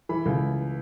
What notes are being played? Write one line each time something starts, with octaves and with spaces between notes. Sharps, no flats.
E3 B5
C#2